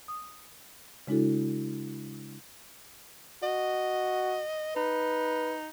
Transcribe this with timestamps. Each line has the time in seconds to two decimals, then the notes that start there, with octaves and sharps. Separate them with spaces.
0.08 D#6
1.07 C#3 G#3 D4 E4 F#4 A4
3.43 F#4 D#5
4.76 D#4 B4